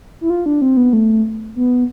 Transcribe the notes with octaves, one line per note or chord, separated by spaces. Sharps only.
E4
F4
D4
C4
B3
A3
B3